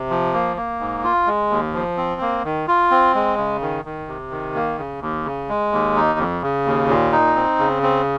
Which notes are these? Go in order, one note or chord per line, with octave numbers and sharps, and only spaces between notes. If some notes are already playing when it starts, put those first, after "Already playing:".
Already playing: C3
F3
A#3
A#3
G#2
F4
G#3
D#2
F3
C4
A#3
D#3
F4
C4
G#3
C#3
D#3
D#3
C3
D#3
A#3
C#3
D#2
C#3
G#3
D#2
D#4
F2
C#3
D#2
A#2
D#4
C4
C#3
C4